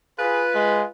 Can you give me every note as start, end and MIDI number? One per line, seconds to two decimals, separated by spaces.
0.19 0.89 65
0.19 0.43 68
0.19 0.89 71
0.55 0.83 56